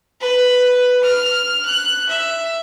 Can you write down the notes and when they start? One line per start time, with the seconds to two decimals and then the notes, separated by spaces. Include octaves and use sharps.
0.20 B4
1.03 F6
1.65 F#6
2.08 E5